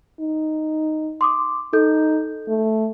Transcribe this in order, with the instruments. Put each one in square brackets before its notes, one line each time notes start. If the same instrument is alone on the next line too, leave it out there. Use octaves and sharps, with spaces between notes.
[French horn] D#4
[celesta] C6 D6 D#6
[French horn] D#4 [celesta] A4 G6
[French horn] A3